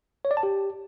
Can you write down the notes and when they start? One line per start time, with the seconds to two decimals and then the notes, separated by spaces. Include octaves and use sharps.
0.25 C#5
0.31 D5
0.37 A5
0.43 G4